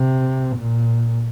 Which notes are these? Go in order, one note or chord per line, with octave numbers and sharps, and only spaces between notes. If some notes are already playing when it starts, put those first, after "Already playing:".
Already playing: C3
A#2